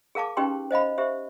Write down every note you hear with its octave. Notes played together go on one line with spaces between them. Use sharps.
G#4 A#4 F5 A5 D6
C#4 D#4 G4 B4 G5 C6
C5 D#5 F5 B5
G4 C5 E5